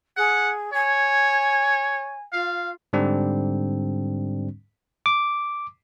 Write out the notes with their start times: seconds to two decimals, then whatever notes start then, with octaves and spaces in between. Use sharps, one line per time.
0.17 G#4 F#5
0.73 C#5 G#5
2.33 F4 F5
2.93 G#2 D3 G3 C4 D4
5.06 D6